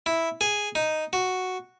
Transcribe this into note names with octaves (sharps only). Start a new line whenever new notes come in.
E4
G#4
D#4
F#4